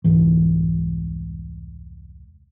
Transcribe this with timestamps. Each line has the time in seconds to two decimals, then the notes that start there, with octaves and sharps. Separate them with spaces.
0.04 E1 C2 G#2 E3